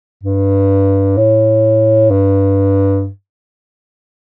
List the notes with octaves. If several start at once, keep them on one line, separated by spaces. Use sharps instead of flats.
G2
A2
G2